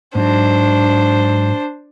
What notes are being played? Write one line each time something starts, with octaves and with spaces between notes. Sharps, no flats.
G#2 F#3 D4 C5